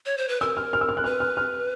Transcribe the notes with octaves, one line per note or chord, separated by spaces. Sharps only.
C#5
C5
B4
A#4 E6
F6
F6
E6
F6
F#6
B4 F6
F6
F6